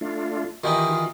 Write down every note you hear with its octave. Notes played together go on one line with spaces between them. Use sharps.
A3 D4 F4
D#3 E3 D#4 F4 G4
F4